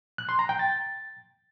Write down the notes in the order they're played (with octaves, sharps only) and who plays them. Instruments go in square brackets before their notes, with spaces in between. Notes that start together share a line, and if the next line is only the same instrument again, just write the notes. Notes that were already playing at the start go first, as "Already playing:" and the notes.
[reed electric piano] F#6
C6
A#5
G5
A6